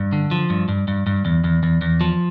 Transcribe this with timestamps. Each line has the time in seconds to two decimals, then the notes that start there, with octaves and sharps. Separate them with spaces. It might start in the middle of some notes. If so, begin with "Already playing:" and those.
Already playing: G2
0.13 D3
0.31 F3
0.50 G2
0.69 G2
0.88 G2
1.07 G2
1.25 E2
1.44 E2
1.63 E2
1.81 E2
2.01 F3